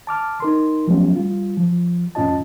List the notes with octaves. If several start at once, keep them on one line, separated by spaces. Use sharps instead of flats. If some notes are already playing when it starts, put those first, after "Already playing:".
A5 D6 F6
D#4 A#4 C6
F3 F#3 A3 B3 C#4 G4
G3 F4
F3
F2 A2 C#4 F4 D#5 A5